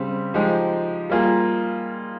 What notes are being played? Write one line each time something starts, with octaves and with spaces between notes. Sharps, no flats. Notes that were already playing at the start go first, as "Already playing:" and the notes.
Already playing: C#3 G3 C4
F3 G#3 D#4 G4
G3 A#3 F4 G#4